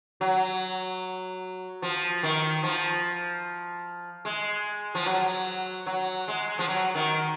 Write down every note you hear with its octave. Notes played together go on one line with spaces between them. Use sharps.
F#3
F3
D#3
F3
G#3
F3
F#3
F#3
G#3
F3
F#3
D#3